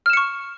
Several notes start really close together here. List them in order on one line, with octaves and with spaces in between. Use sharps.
F6 E7 C#7 C#6